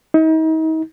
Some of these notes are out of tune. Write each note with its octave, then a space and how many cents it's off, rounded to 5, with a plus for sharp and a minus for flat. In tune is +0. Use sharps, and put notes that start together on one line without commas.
D#4 +40